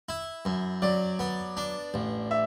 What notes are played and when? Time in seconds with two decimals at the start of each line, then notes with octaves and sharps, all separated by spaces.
0.09 E4
0.45 F#2
0.82 F#3 D5
1.19 B3
1.57 D4
1.94 A1
2.31 E5